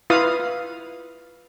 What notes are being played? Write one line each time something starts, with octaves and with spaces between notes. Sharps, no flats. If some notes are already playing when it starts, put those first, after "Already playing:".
E4 F4 B4 F5 D#6